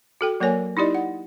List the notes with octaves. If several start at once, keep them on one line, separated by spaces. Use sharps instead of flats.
F#4 A4 G5
F#3 A#3 A#4 C#5 G#5
D#4 E4 G4 D5 D#5
F#5